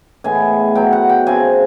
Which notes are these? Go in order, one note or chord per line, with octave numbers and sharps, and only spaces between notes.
A2 E3 G#3 B3 G#5
B2 F#3 A3 G5
F#5
G5
C#3 F3 A3 C4 G#5